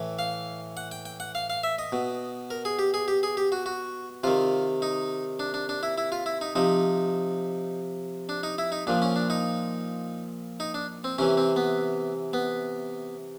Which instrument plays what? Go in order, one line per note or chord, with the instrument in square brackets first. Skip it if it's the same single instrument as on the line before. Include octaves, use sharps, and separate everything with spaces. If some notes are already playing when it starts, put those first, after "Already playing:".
Already playing: [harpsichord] A2 E3
F5
F#5
G5
G5
F#5
F5
F5
E5
D#5
B2
A#4
G#4
G4
G#4
G4
G#4
G4
F#4
F#4
C3 D#3 F4
D#4
D4
D4
D4
E4
E4
F4
E4
D#4
C3 F3 D#4
D4
D#4
E4
D#4
A#2 F3 D4
C#4
D4
D#4
D#4
D4
C4
C3 E3 C#4
C4
B3
B3